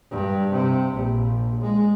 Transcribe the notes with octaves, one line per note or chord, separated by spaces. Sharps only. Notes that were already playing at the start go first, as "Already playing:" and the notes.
G2
C3
A#1
G#3